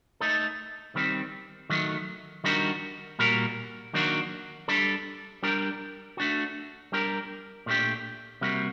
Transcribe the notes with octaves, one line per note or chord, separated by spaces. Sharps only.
A3 D#4 A4
D#3 G3 C4
D#3 F#3 A3
D#3 G3 D4 F#4 A#4
A#2 G3 A#3 F#4 A#4
D#3 F#3 A#3 D4 F#4
G3 D4 A4
G3 D4 G4 A#4
A3 D4 F#4
G3 D4 G4 A#4
A#2 A3 D4 G4
C3 G3 A#3 F#4